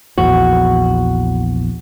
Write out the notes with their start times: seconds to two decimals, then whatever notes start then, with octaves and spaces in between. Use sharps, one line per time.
0.18 A#1 E2 F#4